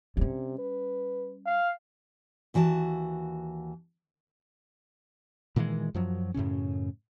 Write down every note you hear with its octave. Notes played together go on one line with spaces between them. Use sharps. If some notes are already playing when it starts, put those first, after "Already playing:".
C3 G3 C#4
B4
F5
D#2 E3 F#4 C#5 A5
A#2 D#3 E3 G#3
F#2 F3 F#3
F#2 A2 C#3 C#4